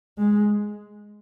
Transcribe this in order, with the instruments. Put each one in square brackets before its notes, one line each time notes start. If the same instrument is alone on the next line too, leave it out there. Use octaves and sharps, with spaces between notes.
[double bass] G#3